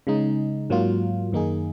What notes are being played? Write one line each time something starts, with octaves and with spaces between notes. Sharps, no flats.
C#3 G#3 D#4
G#2 F#3 A#3 F4
F#2 D#3 A#3 D#4 G#4